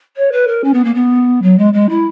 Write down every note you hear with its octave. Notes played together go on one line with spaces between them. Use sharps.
C#5
B4
A#4
C#4
B3
A#3
B3
F#3
G#3
G#3
E4